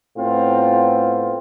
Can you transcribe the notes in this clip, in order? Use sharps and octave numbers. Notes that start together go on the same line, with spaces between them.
A2 B3 C4 F4